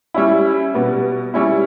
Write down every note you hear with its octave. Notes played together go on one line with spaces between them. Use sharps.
G3 C#4 E4
B2 G3 B3
G3 C#4 E4